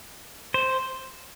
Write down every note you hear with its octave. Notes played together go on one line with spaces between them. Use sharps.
C5